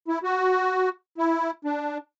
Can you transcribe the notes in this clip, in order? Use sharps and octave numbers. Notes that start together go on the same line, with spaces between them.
E4
F#4
E4
D4